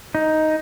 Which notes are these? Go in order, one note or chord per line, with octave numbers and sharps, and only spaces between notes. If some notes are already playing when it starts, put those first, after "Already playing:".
D#4